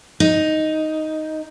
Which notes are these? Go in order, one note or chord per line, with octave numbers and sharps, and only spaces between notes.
D#4